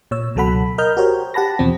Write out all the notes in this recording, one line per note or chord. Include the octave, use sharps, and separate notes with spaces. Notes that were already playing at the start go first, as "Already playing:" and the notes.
A#2 C#5 E6
C#2 B2 F#3 A4 F#5 B5
A#4 D#5 F6 G6
F#4 G4 A#4 C5 C#5
G4 F#5 A5 B5 A#6
E2 B2 F3 C4